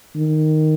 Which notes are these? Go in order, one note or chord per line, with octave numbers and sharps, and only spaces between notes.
D#3